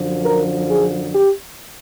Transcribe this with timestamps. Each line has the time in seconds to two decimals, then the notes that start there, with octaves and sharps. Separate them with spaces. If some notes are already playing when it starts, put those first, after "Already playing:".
Already playing: F#2 D3 F3
0.24 A#4
0.69 G#4
1.14 G4